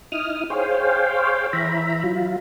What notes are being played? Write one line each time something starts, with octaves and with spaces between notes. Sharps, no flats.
D#4 E4 D#6 F6
G#4 C5 C#5 F5 G5
E3 E5 A#5 B5
F#3 F4